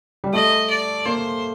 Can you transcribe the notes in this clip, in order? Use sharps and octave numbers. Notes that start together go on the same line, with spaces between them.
G3
A3 D#5
D5
A#3 C5